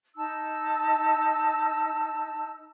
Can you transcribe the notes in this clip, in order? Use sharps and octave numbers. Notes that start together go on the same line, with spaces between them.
D#4 A5 E6